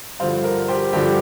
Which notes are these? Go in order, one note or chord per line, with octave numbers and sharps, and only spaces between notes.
G2 D3 F3 C5 F5
A#4
G4 C5
G2 D3 F3 G4 C5